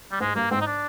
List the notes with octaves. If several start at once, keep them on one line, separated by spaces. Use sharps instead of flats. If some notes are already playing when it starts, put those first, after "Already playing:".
G3
G#2 G#3
G2 A#3
G#2 C4
D#4
D4